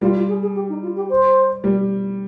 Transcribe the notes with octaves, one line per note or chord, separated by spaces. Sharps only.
G3 F4
F4
G#4
G#4
G4
D#4
F4
G4
C5
G3